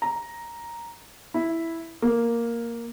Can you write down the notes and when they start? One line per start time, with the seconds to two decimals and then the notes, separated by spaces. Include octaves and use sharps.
0.02 A#5
1.34 E4
2.02 A#3